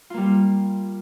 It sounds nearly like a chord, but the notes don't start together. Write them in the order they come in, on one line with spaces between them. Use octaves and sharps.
F4 A#3 G3